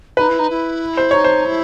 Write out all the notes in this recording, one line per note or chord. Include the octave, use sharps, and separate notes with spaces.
D#4 B4
E4
D#4
E4
C5
D#4 C#5
C5
E4